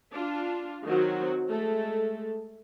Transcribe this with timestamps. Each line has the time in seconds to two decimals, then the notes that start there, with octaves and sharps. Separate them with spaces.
0.12 D4 F4
0.85 D#3 F#3 C4 F#4
1.48 G#3 A3 A4